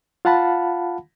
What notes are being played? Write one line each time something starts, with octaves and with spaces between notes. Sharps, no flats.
F4 F5 F#5 A5 B5